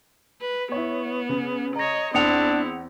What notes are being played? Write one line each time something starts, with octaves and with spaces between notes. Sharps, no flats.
B4
B3 E4 C#5
C#3
C#5 D#5 A#5 A#6
E2 C4 D4 E4 F#5 D#6 C#7 F7